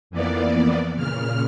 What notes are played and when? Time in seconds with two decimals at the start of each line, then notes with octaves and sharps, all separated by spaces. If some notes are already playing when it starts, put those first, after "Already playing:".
0.10 F2 E3 A#3 B3 D5
0.95 A#2 C#3 F6